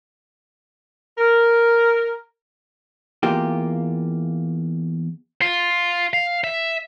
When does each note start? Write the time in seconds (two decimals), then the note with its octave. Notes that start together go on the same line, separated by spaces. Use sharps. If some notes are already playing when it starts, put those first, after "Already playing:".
1.18 A#4
3.23 E2 A#3 F4 G4
5.42 F4
6.13 F5
6.44 E5